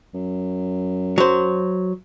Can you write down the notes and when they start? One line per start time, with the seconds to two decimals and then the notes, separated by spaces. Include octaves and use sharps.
0.14 F#2
1.18 F#3 C5